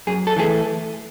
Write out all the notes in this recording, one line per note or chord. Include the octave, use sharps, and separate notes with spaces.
F#2 G#4
A4
E3 A3 G#4